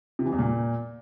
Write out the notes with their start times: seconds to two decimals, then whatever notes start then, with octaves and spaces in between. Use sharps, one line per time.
0.19 C3
0.26 E3
0.32 E2
0.39 A#2